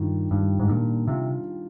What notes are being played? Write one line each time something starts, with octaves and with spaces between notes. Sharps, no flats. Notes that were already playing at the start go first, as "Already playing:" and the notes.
Already playing: G2 D#3 G3 D4 F4
G2 G3
G#2
A#2 D4
C3 F4